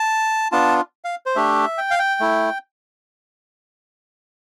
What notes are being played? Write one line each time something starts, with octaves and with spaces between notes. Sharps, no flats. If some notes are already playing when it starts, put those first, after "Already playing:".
Already playing: A5
B3 D4 F4 A5
F5
C5
A3 D4 G4 E5
G5
F5
G5
A3 E4